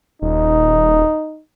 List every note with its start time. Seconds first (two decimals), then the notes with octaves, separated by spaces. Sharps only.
0.22 D#1 D#4